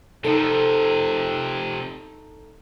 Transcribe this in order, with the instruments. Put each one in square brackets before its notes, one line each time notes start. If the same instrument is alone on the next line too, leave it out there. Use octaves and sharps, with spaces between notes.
[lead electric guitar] C3 F3 [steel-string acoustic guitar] D#4 A4